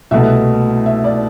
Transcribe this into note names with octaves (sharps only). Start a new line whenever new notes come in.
C2 B2 A3 E5
E5
D5